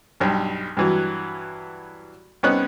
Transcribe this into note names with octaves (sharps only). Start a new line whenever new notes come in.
B1 G2
G2 E3 F#3
C2 B3 C#4 D#4 F#6